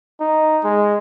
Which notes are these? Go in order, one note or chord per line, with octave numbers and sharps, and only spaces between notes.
D#4
G#3